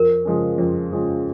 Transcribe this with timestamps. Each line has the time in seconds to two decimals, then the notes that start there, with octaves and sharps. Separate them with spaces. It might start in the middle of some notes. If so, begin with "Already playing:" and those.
Already playing: F2 A#4
0.25 C#3 F3 G#3 C#4
0.58 F2
0.92 C#3 F3 G#3 C#4